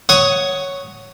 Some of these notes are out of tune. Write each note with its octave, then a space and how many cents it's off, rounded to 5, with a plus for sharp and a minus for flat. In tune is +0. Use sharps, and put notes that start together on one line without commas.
C#5 +0 F#5 +10 D#6 +10